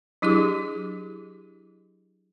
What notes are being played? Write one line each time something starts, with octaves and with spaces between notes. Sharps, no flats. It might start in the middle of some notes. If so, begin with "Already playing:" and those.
F#3 D4 E4 G4 G#4 D6